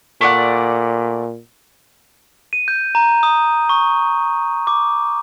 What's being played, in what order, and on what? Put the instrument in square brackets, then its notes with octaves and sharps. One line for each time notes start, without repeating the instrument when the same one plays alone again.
[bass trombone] A#2 [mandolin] A3 D5 F#5
[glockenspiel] D#7
G6
A#5
D#6
C#6
D6